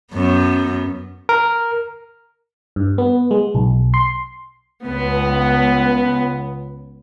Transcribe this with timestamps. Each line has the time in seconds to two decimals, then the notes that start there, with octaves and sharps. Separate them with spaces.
0.13 F#2 B3
1.29 A#4
2.76 G2
2.98 B3
3.31 G#3
3.55 B1
3.94 C6
4.85 C#2 B3